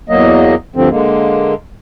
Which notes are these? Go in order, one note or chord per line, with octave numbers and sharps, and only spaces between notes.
E2 F#3 A#3 D#5
D2 G2 D3 F3 C4
D3 G#3 A#3